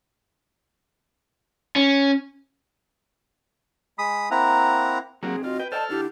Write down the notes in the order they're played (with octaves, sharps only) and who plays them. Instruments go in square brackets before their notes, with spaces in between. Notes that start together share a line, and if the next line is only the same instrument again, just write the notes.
[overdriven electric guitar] C#4
[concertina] G#3 B5 D#6
A#3 C4 E4 E5 F#5 A#5
[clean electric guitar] C3 F3 C4 [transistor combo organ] F#3 A#3 [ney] G#4
[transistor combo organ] F4 [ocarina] F#4 [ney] D#5
[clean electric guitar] B4 [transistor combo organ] G5
[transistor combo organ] A4 F6 [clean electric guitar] C5 G5 A5 [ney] D5 [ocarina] D#5
[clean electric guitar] D3 [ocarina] E4 [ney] G4